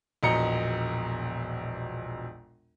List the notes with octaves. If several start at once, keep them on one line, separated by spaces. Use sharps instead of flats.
E1 A#1 B2 D#5 A#5 C#7